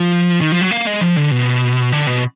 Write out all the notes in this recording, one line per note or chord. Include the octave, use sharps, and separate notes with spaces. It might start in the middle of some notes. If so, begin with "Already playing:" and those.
Already playing: F3
D#3
F3
F#3
A#3
G#3
F3
D3
B2
D3
B2